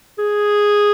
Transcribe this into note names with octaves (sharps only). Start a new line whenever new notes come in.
G#4